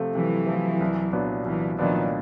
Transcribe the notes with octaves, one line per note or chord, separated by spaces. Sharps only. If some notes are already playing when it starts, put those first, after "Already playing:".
Already playing: C3 F3 A3
C3 E3 F#3
F3 A3
C2
A#2 F#3 B3 D4
C2 E3 F#3
A#2 D#3 F3 F#3 B3 D4